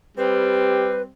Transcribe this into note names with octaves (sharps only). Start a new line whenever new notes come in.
G3 C4 G4 B4